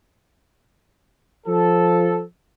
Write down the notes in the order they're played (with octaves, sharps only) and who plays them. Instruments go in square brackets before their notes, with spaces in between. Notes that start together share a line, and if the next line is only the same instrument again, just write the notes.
[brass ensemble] F3 A4